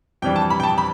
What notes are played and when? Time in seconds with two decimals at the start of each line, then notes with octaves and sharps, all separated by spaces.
0.22 F2 E3 G3 D4 G5
0.36 A5
0.50 B5
0.60 G5
0.63 A5
0.78 B5